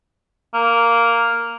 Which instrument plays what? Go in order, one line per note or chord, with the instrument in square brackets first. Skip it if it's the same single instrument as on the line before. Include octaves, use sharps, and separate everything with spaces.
[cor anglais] A#3